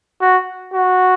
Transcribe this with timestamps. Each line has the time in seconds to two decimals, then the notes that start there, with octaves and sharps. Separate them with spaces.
0.21 F#4
0.74 F#4